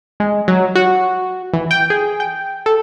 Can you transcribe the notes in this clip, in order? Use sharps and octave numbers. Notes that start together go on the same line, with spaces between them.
G#3
F#3
F#4
E3
G5
G#4
G5
A4